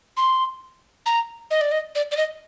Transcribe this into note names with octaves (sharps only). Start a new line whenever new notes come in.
C6
A#5
D#5
D5
D#5
D5
D5
D#5